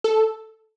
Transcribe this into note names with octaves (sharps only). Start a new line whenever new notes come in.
A4